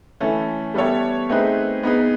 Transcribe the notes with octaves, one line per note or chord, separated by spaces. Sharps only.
E3 A3 C#4 E4 A4
G3 B3 E4 A4 C#5
A3 C4 D#4 G#4 B4
B3 D#4 G#4 B4